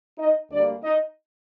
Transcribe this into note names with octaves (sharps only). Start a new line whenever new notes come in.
D#4 D#5
D2 D3 G3 A#3 D4 D5
D#4 D#5